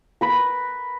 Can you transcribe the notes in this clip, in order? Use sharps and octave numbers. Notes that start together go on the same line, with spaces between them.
A#4 B4